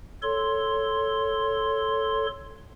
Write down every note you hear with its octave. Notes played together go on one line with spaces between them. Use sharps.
A4 C#5 C6